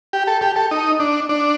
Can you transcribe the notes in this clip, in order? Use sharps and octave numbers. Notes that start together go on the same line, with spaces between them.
G4
A4
G4
A4
D#4
D4
D4